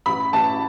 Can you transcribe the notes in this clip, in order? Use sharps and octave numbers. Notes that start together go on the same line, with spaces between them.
A1 B5
A1 A5